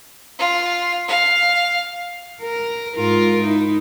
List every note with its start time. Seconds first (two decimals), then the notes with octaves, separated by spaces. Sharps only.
0.39 F4
1.08 F5
2.42 A#4
2.96 G#2 F4 A#4
3.43 D#4 E4